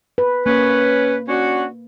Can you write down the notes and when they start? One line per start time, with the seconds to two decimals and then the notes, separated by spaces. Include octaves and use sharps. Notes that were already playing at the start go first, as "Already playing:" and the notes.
0.18 B4
0.46 A#3 C#4 B4
1.28 C#4 D4 F#4